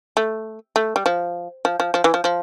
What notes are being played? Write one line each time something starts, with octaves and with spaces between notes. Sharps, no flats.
A3
A3
G3
F3
F3
F3
F3
E3
F3
F3